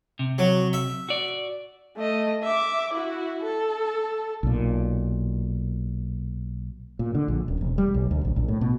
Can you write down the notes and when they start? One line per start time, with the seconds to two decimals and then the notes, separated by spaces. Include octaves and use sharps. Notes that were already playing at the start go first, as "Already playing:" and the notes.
0.19 C3
0.38 F#3
0.73 E5
1.09 F#4 D5
1.97 A3 D#5
2.43 E5 D6
2.93 E4 F#4
3.43 A4
4.43 B1 A#2
6.99 A#2
7.15 D3
7.28 A#1
7.48 D#1
7.61 E1
7.78 G3
7.94 B1
8.11 D2
8.25 A#1
8.36 A#1
8.48 A2
8.61 B2